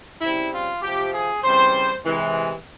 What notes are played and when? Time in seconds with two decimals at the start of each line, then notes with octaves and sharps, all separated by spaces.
0.21 C#3 G3 C4 E4
0.52 F4
0.82 C3 F3 C4 G4
1.13 G#4
1.43 C#3 E3 G3 C4 C5
2.05 C3 E3 G#3